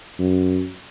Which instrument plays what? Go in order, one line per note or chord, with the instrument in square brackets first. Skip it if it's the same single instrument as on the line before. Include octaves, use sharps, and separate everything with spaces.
[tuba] F#2